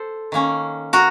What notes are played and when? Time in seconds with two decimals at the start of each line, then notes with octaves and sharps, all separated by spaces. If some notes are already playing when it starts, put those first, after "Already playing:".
Already playing: A4 C5
0.32 D#3 A#3 C#4
0.93 F#4 A#4